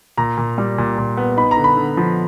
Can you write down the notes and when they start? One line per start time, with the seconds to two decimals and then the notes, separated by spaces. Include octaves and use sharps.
0.17 A#2 A#5
0.37 A#2
0.58 G3
0.78 A#2
0.98 A#2
1.17 B3
1.37 D#4 B5
1.51 A#5
1.57 D3
1.64 B5
1.77 D3
1.97 F3